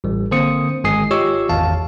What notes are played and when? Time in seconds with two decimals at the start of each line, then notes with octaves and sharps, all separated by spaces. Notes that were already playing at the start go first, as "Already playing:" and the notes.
0.04 A1 G3
0.31 D3 A#3 C4 C5 D#6 C#7
0.84 G#1 G#3 G#5 D#6 C7
1.11 F4 G4 C#5 D#5 C#6 E6
1.49 G#1 E2 F5 A5